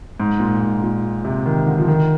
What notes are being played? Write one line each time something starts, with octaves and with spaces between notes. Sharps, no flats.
G#2
A#2
G#2
A#2
C3
D#3
D3
F3
D#3